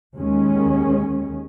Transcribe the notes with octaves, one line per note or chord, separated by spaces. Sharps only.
D#2 D#3 G#3 C#4